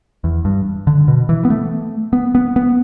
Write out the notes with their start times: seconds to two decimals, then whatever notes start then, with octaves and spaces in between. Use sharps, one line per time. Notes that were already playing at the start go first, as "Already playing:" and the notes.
0.24 E2
0.45 G2
0.87 D3
1.08 B2
1.29 E3
1.45 B3
1.50 A3
2.13 B3
2.35 B3
2.56 B3